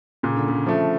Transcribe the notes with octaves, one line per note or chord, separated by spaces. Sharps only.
A#2 C#3
D3
C#3
F3 A3